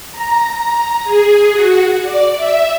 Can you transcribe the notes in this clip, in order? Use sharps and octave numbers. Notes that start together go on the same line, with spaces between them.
A#5
A#5
G#4
F#4
D5
E5